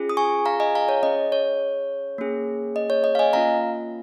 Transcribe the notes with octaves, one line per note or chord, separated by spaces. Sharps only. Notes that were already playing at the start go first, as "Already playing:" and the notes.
Already playing: C#4 F4 G#4
D#6
G#5 C#6
F5 A#5
D#5 G#5
F5 A#5
C#5
C#4 G#4 D#5
C#5
A#3 C#4 G#4
D#5
C#5
D#5
F5
D#5 G#5
A#3 C#4 F4 F5 A#5